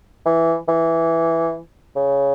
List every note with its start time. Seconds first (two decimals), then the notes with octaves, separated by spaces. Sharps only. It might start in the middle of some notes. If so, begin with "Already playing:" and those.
0.26 E3
0.68 E3
1.96 C#3